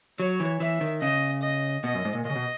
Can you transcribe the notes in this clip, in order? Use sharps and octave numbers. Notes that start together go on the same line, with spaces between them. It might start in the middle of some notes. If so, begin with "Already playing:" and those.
F#3 C#5
E3
E3 E5
D#3
C#3 D#5
D#5
B2 D#5
F#2
G#2
A#2
A#2 C#3 D#5
B2